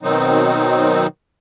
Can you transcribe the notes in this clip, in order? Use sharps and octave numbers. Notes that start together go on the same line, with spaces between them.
B2 D#3 F#3 C4 D#4